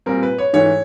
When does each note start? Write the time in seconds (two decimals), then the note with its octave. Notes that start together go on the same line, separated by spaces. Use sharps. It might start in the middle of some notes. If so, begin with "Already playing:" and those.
0.06 A#2 G3 C4 A#4
0.23 B4
0.38 C#5
0.53 G#2 E3 A3 C#4 C#5